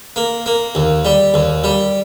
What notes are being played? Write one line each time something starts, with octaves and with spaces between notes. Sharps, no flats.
A#3
A#3
D#2
G3
D#2
G3